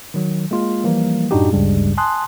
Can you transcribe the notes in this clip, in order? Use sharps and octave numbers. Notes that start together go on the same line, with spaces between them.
D#3 F#3
G#3 A#3 F4
E3 F3 G3 A#3
F#2 A2 D4 D#4 F#4 G4
G#1 D2 G2 C#3 G3 G#3
G#5 A5 C6 D#6 F#6